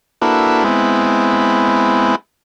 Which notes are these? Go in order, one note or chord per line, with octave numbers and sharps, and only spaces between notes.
A#3 D4 E4 F#4 A4 B4
G#3 B3 C4 E4